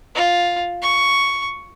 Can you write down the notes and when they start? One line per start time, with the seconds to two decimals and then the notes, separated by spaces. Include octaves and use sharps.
0.15 F4
0.82 C#6